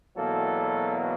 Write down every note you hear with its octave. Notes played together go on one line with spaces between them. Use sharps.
E2 B2 F#3 A#3 A4